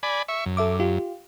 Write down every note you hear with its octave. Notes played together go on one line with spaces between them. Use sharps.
D5 G#5 B5
E5 C#6
F#2
A4 E5 D6
F4 G4